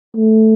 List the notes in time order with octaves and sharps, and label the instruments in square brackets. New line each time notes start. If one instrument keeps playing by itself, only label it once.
[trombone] A3